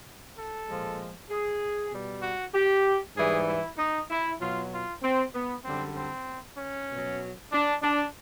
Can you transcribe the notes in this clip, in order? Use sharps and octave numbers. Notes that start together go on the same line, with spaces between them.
A4
A#2 F3 G#3
G#4
B2 G3
F#4
G4
G#2 E3 G3 G#4
E4
D#4
E4
B2 F#3 F4
F4
C4
B3
F#2 D3 G3 C4
C4
C#4
B2 F#3
D4
D4